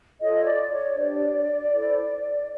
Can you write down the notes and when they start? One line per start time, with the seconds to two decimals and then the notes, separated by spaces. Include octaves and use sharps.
0.21 F4 A4 C#5 D#5
0.38 C#5
0.46 D5
0.72 C#5
0.96 D4 G4 C5 D5
1.72 E4 A4 C5